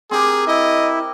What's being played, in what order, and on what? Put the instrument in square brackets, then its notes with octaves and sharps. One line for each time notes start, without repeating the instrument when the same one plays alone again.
[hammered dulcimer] C4 G4 A#4 [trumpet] G#4
[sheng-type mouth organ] E4 [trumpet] D#5